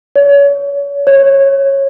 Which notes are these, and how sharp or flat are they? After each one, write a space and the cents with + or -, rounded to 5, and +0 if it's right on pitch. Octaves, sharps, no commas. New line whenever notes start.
C#5 +30
C#5 -15